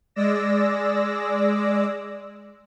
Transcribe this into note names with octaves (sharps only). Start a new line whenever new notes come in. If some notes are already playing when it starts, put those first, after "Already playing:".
G#3 D5 E6 A#6